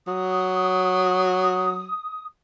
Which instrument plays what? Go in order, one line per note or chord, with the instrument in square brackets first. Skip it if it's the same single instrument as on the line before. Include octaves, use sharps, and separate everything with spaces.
[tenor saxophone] F#3 [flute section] D#6